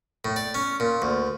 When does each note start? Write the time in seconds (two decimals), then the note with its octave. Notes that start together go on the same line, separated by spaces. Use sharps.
0.25 A2
0.36 D5
0.54 C#4
0.80 A#2
1.02 D2